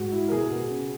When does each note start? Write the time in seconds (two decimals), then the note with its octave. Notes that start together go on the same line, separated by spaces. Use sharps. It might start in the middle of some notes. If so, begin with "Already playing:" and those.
Already playing: G#2 F#4
0.12 E4
0.28 A#4
0.32 B2 G#4
0.51 B2
0.71 C#3